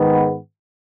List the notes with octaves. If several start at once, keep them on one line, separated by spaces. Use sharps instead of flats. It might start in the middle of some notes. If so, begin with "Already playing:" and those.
Already playing: G#2 D#3 G#3 B3